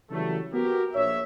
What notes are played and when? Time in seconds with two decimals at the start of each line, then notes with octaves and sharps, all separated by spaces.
0.10 C#3 E3 F#3 G3 A3
0.52 B3 F#4 G4 A#4
0.94 A#1 C#5 E5